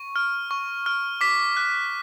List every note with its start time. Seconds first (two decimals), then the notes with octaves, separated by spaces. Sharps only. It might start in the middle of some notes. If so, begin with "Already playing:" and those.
Already playing: C#6
0.16 F6
0.51 C#6
0.86 F6
1.21 D6 B6
1.57 F#6